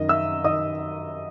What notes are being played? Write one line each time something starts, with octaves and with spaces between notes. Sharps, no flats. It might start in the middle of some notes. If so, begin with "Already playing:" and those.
Already playing: F#2 D#3 D#5
E5 E6
D#3 D#5 D#6